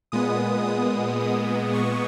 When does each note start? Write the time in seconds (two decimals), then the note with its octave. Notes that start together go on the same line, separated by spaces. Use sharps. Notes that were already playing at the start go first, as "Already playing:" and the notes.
0.12 A#2 G#3 B3 D#6
0.66 D#6
1.20 D#6
1.74 C#6